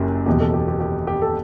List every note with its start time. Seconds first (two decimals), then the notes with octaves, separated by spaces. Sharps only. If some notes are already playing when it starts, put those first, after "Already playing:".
Already playing: F#1 F#2 C#3 G4
0.26 F#1 E2 B2 G4
0.40 A4
0.54 G4
0.68 G4
0.80 G4
1.07 G4
1.22 A4